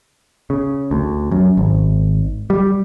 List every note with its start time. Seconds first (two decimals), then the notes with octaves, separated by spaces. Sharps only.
0.50 C#3
0.91 D2
1.31 F#2
1.57 G#1
2.50 G3